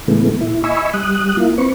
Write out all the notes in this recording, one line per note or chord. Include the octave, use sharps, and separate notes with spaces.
A2 C#3 E3 G#3 A3 B3
A#2 E4
D#5 E5 G#5 B5 C#6 E6
G3 D#6 F#6
A#3 E4 F4
C4 B4 C#6